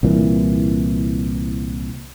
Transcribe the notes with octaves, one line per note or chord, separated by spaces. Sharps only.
C2 A#2 E3